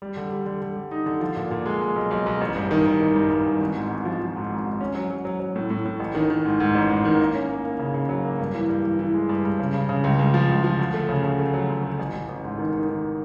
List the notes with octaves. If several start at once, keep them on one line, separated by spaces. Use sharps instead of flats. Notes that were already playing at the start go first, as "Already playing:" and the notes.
G3
D3
G3
D3
D3
G3
D#4
D3
F3
A#2
A#2
G#3
G#3
B1
B1
B1
A1
G2
D#3
D#3
D#3
G2
G2
A1
G#1
G#2
G#1
F3
F3
G#2
G#1
G#2
C#4
F#3
F#3
F#3
F#3
A2
A2
A2
A1
D#3
D#3
G#2
G#2
A1
G#2
D#3
A#3
C#4
A#3
A#3
C#3
C#3
F#3
A#3
G2
E3
G2
E3
E3
G#3
G2
G2
C#3
C#3
C#3
C#2
C#2
F3
C#2
F3
D2
A3
C#3
C#3
A3
F#3
D2
A3
A1
A1
A1
G#2
D#3
D#3
D#3